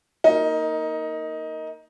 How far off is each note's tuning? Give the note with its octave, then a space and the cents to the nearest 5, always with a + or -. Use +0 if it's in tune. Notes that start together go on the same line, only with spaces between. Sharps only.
A#3 -10 D#4 +15 D#5 -15